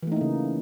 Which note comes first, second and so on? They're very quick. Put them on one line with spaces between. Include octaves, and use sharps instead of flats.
E3 A3 D#4 A#3 C#3